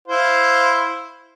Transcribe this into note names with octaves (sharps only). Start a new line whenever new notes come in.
E4 C5 F5